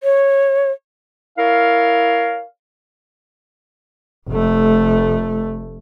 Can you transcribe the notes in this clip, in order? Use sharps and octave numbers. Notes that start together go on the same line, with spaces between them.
C#5
E4 A#4 C#5 F5
F1 A3